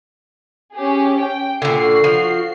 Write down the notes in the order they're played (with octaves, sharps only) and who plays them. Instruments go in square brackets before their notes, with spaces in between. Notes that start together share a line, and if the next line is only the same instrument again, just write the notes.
[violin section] C#4 G4 G#4
G5
[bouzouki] A#2 D3 [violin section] F#4 C7
[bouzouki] F3